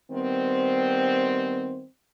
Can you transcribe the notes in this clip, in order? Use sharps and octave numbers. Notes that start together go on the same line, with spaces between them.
D#3 G3 B3 C4